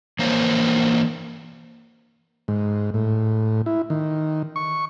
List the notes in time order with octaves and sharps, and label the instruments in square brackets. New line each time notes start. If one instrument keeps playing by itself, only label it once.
[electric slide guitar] E3 A#3 A#4 C5 C#5
[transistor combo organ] G#2
A2
E4
D#3
C#6